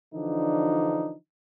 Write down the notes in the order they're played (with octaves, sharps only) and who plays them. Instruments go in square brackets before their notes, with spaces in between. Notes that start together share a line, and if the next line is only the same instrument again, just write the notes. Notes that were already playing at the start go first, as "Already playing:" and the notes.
[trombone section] D3 E3 F3 D4 D#4